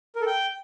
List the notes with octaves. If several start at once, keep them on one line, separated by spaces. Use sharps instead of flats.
A#4
A4
G5